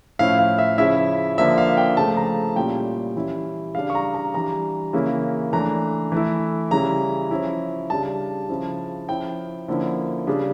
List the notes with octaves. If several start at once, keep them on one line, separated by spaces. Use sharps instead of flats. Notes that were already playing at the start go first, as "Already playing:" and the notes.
A2 F3 C#4 E4 F5
F5
E5
C#3 F3 C#4 E4 E5
D3 F3 A#3 D4 E5
F5
G5
C#3 F3 A3 A5
A#5
A#2 G3 C#4 E4 G5
E3 G3 C#4 E4
C#3 G3 D4 F5
C#6
A#5
A#5
E3 G3 D4 A#5
C#3 E3 A#3 C#4 E4
E3 A3 D4 A#5
E3 A3 E4
C#3 E3 G3 C#4 E4 A#5
F3 C#4 E4
C#3 G3 D4 A5
C#3 F3 C#4 E4
F3 C#4 E4 G5
D3 F3 A#3 C#4 E4
C#3 G3 D4